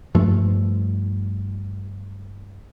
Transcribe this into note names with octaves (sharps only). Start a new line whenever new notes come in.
G2 F3 A3